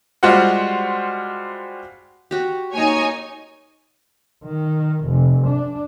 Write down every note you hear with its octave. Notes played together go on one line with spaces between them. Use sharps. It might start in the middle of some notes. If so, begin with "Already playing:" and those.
G3 G#3 F4 F#4 C5 F#5
F#4 G4
A#3 D#4 C#5 G#5
D#3
F1
D4